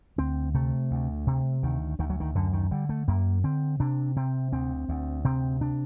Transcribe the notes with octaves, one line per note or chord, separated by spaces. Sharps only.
D2 C4
C3 A3
D2
C3
D2 D#3
D2 D#3
F#3
D#3
F#2 D3
D#3
D3 G3
A3
F#2 A#3
D3 C4
C3 D4
C3 C4
D2 C4
D2
C3 C4
C3 D4